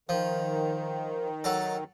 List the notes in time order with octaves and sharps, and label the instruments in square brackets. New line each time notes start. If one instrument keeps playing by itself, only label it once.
[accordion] D#3 [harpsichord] F3
[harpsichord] F#3 A4